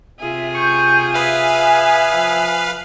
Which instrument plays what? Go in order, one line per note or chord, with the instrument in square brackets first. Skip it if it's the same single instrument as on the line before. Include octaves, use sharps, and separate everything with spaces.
[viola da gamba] C3 F4 G#4 [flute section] E5
[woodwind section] C#6 [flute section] G6
[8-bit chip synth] B4 F5 [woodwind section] E5 [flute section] G#5 D#6
[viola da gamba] F3